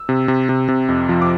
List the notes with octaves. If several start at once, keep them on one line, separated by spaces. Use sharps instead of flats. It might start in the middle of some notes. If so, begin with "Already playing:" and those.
Already playing: E6
C3
C3
C3
C3
F2
F3
D6